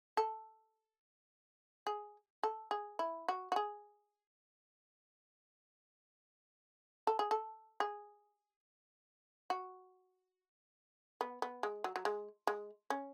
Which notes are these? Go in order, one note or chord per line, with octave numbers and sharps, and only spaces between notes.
A4
G#4
A4
G#4
E4
F#4
F#4
G#4
A4
G#4
A4
G#4
F#4
B3
B3
G#3
F#3
F#3
G#3
G#3
C#4